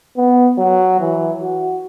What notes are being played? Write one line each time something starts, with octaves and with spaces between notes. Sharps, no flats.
B3
F#3
E3
F#4